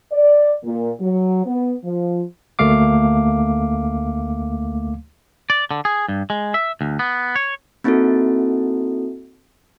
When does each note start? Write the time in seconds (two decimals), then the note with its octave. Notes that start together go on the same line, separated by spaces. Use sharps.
0.12 D5
0.63 A#2
1.01 F#3
1.45 B3
1.84 F3
2.59 D2 A3 A#3 F5 D6
5.50 D5
5.71 D3
5.85 G#4
6.08 G2
6.30 G#3
6.54 E5
6.81 D2
6.99 B3
7.36 C#5
7.84 A#3 C4 D#4 E4 F#4 A4